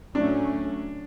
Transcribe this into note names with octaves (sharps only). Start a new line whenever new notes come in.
A2 F#3 A3 C#4 D4